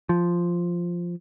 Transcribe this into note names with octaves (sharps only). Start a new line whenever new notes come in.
F3